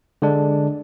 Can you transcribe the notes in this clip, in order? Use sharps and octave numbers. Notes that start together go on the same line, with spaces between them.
D3 G#3 D4